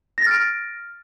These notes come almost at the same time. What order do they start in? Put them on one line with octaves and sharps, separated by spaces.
A#6 A6 F6 D7